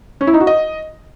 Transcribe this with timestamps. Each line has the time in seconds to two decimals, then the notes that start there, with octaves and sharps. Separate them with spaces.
0.21 C#4
0.27 E4
0.34 D#4
0.40 F#4
0.47 D#5